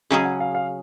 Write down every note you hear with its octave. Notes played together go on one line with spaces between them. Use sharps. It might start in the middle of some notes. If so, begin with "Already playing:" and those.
C#3 F#3 C#4 G#4 D#5
F#5
F5
F5